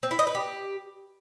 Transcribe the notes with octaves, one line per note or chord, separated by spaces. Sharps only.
C4
E4
D#5
B4
G4